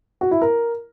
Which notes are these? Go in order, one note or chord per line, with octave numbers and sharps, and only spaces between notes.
F#4
E4
A#4